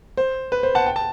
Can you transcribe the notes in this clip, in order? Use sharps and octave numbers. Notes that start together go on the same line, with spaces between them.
C5
B4
C5
F#5 A5
G5
A5